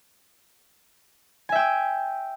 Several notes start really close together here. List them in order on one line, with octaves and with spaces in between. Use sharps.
G#5 E5 G5 E6